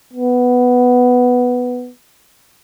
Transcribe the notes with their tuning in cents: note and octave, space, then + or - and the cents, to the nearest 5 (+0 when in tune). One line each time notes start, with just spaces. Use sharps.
B3 +5